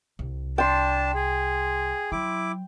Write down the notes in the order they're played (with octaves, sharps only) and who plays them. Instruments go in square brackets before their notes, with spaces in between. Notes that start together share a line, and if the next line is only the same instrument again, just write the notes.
[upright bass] C2
[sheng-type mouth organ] D4 A5 [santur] G5 C6
[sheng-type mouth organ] G#4
[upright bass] F#3 [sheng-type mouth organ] E4 D6